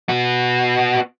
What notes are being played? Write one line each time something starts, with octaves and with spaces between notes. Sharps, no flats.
B3 F#4